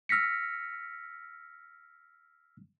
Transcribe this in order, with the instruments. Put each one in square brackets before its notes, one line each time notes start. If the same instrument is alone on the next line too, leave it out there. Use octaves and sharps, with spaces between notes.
[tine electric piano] E6 F6 A#6 B6 C#7